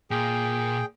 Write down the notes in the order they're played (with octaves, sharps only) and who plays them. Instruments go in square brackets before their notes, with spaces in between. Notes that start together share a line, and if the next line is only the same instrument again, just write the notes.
[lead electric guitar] A#2 [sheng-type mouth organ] G#4 G5